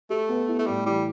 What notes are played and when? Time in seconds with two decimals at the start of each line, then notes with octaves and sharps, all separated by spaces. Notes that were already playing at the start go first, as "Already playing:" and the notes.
0.10 A3 G4
0.29 B3
0.49 E4
0.59 A3
0.67 A2 G3
0.86 E3 G3